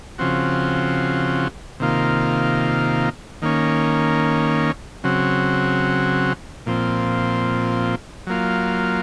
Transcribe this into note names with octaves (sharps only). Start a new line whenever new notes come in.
C#3 F3 C4 F#4
C3 D#3 A#3 F4
D#3 A#3 C#4
C#3 F#3 C4 F#4
A#2 F3 C4
F#3 A#3 F4